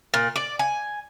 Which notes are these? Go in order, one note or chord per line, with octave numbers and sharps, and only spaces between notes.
A#2
D5
G#5